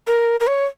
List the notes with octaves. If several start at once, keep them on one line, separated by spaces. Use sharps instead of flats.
A#4
A#4
C#5